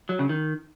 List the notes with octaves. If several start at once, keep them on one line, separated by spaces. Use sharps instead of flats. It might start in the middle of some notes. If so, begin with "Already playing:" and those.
F#3
C#3
D#3